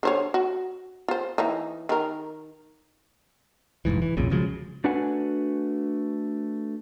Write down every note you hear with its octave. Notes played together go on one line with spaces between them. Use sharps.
D3 C5 C#5
F#4
F4 C5
E3 A#3 D#4
D#3 A#4
F1 C#2 G#2 E3
E3
B1 F2 A#2 C#3
C#3 F3 F#3 G#3
A3 D4 F#4 B4 F#5 G#5